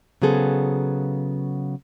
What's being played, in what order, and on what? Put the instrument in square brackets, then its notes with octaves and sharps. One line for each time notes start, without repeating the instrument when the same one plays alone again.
[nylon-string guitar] C#3 F#3 B3 G#4 A4 C5